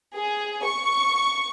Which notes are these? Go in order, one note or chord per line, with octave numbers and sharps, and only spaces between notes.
G#4
C#6